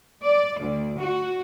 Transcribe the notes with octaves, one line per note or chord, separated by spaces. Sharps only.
D5
D2
F#4